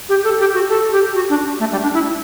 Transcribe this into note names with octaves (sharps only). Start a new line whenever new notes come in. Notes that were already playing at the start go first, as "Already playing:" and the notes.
G4
A4
G4
F#4
A4
G4
F#4
D4
A3
G3
D4
E4